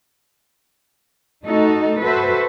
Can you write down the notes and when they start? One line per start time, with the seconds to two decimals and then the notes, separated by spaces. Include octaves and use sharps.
1.44 A3 D#4 F#4 A4
2.02 F#4 A4 B4 C5 E5